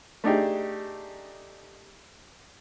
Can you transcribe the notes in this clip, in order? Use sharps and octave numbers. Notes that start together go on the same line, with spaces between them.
A3 D4 D#4 G4 G#4